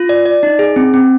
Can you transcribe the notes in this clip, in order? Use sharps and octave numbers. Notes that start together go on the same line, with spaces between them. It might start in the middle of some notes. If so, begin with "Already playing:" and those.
Already playing: F4
D5
D5
D#4
G#4
C4
C4